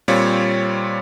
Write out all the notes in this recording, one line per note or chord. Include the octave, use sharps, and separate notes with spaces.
A#2 G3 C4 F4 C#5